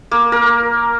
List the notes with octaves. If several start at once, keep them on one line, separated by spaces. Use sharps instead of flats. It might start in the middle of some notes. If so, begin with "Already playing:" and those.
A#3
A#4